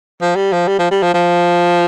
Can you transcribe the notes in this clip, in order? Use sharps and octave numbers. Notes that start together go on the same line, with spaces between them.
F3
G3
F3
G3
F3
G3
F3
F3